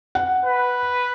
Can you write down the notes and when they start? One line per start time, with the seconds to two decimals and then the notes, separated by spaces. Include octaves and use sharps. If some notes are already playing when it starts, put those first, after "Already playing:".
0.15 F#5
0.46 B4